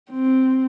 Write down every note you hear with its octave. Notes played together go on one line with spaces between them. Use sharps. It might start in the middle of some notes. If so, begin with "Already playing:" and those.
C4